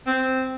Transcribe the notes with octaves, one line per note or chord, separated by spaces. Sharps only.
C4